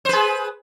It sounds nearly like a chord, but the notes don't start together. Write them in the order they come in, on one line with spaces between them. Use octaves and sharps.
C5 B4 G#4